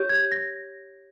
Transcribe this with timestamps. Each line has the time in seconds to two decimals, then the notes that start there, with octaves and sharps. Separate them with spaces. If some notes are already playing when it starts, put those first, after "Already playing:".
Already playing: G4 C#5 G6
0.09 G#6
0.32 A#6